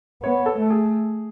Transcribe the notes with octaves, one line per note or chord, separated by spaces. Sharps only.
B3 C#5
A4
A3
G#4